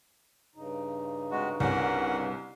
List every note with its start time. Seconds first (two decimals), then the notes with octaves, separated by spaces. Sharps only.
0.55 G2 C#3 D#4
1.31 C3 G#3 F#4
1.60 C2 C#4 A#4 F#5